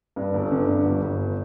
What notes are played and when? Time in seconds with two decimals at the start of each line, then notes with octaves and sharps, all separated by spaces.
0.16 G2
0.34 G1
0.52 D3
0.68 G2
0.85 G1
1.02 G1